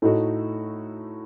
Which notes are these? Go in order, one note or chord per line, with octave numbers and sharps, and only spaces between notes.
A2 A3 D#4 F#4 A4